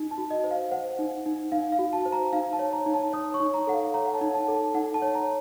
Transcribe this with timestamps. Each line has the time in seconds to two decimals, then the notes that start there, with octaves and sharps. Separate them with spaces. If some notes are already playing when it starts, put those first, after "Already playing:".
Already playing: D#4
0.11 A5
0.18 F#4
0.31 D#5
0.44 C5
0.51 F5
0.71 C5 F#5
0.99 D#4
1.26 D#4
1.52 D#4 F5
1.72 F5
1.79 F#4
1.93 A5
2.06 C5
2.12 A#5
2.33 D#4 F5
2.53 A5
2.59 C#5
2.73 A#5
2.86 D#4
2.94 A5
3.13 C#5 D#6
3.34 C#6
3.40 D#4
3.54 A#5
3.67 A4 F#5
3.73 F5
3.94 C#5 A#5
4.06 F#5
4.14 A5
4.21 D#4
4.34 A5
4.48 A4
4.55 A5
4.74 D#4 F#5
4.94 A5
5.02 C#5
5.15 A#5